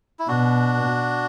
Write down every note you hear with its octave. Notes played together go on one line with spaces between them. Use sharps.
E4
B2 D4 F#4